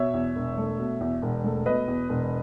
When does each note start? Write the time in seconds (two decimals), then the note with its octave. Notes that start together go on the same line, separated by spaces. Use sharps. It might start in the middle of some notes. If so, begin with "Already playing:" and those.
Already playing: B2 C#5 E5
0.13 E2
0.36 E1
0.57 A3
0.79 B2
1.00 E2
1.22 E1
1.44 A3
1.66 B2 B4 D#5
1.88 E2
2.09 E1